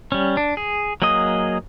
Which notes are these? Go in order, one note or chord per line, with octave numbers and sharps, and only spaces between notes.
G3 C#4
D4
G#4
F#3 A#3 G#4 D#5 D#6